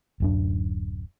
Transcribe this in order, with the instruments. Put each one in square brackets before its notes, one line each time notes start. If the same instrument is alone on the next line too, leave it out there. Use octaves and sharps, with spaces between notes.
[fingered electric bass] D1 F#2 D4